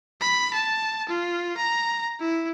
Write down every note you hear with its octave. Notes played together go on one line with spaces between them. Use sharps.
B5
A5
F4
A#5
E4